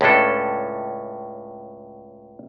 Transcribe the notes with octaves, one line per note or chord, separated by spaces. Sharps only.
C#2 A2 C#4 D4 A4